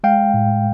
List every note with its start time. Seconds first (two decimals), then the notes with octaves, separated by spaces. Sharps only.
0.04 G#3 F5 G5
0.34 A2